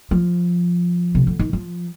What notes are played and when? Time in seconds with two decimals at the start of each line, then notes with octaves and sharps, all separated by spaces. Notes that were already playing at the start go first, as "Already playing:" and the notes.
0.11 F3
1.15 C3
1.27 D3
1.39 D#3
1.53 F3